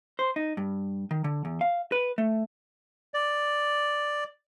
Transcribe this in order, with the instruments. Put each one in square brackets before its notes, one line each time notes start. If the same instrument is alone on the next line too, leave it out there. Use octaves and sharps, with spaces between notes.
[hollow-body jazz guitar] C5
D#4
G2
D#3
D3
E2
F5
B4
A3
[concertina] D5